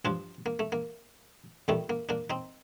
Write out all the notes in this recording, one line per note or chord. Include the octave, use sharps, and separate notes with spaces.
G2 F3 D4 F4
A#3
A3
A#3
F2 D#3 G3 A3
A#3
A#3 D4
C4 D#4